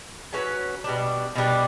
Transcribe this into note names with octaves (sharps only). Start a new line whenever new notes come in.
F#3 C#4 F#4 B4
B2 G3 D4
B2 G3 D4